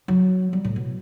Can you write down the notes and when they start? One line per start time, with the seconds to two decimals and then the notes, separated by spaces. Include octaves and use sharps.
0.08 F#3
0.53 G3
0.65 A2
0.76 B2